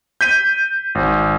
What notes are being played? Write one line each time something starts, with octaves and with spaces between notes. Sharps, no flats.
G6 B6 D#7
G#1